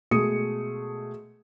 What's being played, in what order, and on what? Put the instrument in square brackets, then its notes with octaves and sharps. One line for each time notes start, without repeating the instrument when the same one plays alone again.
[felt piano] B2 G#3 A3 G#4 D#6 C#7